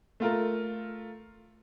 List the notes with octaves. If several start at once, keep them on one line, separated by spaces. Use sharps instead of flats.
A3 F4 A#4